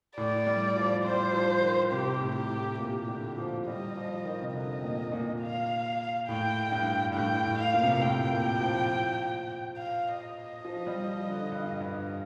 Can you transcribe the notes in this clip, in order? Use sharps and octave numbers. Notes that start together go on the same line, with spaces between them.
A2 D5
G3
F3
G3 C5
F3
D#3
C3 G4
A2
G4
A2
A#2 G4
D3
F3
G3 D#5
F3
D#3
C3
D3 D#5
A#2
A#2
F5
A2 G5
G2
G2
A2 G5
A2
F5
A#2
C3
A#2
A2 G5
A#2
F3
F5
D#5
F3
G3
F3
D3
G2
G2